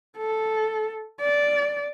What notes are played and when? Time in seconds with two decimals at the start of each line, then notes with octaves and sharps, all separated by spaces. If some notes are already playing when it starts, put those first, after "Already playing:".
0.18 A4
1.21 D5